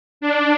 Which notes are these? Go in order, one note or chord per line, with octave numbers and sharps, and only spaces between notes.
D4